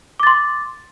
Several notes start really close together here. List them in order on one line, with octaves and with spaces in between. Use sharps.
D6 A6 C6